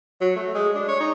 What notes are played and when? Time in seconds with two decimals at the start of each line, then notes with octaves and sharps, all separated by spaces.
0.21 F#3
0.36 A3
0.55 G#3
0.75 D4
0.88 C#5
1.00 D#4